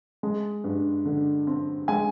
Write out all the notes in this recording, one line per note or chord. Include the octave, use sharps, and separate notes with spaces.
G#3
G2
D3
C4
G#3 G#5